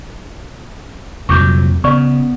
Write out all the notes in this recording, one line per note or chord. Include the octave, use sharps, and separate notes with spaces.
C2 F2 A#2 F#3 C#6 D6 G6
C#3 B3 D5 C#6